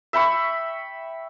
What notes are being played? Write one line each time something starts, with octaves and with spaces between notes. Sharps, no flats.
E5 G5 B5 C#6